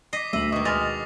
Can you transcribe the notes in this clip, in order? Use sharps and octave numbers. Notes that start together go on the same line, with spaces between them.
D#5 D6 B6 C7
D2 D#5 E5 F#7
B2 D#3 D#5 C#6
G#3 F6 A6 A#6 F7